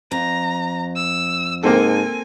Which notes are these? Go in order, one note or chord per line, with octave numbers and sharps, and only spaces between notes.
F2 A#5
E6
G#2 A#3 C4 A4 G#5